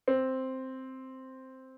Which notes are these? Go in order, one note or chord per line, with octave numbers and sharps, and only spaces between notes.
C4